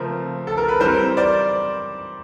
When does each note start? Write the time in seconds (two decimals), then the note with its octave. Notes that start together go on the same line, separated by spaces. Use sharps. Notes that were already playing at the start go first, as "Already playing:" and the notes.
Already playing: C#3 F3 A3 C4 A#4
0.47 A4
0.57 A#4
0.68 B4
0.80 E3 G3 C4 A#4 C5
1.17 C5 D5